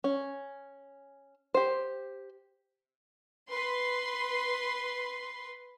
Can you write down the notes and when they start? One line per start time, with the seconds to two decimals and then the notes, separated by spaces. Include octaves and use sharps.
0.04 C#4
1.54 G4 C5
3.49 B4 C6